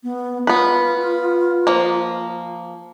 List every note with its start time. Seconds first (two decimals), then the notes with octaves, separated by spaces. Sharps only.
0.03 B3
0.47 B3 F4 B4
1.67 F3 A#3